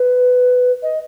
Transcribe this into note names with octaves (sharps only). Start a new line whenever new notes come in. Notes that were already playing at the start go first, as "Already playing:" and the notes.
Already playing: B4
D#5